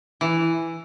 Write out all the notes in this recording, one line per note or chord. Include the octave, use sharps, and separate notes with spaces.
E3